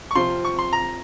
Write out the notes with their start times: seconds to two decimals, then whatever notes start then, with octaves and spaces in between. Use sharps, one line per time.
0.11 C#6
0.15 C3 F3 C4 F4 C6
0.45 C#6
0.59 C6
0.73 A#5